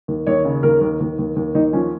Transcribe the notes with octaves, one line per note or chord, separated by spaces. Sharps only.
D#2
D#2 C#5
C#3
D#2 A#4
D#2
D#2
D#2
D#2
D#2 D#4
F3 C#4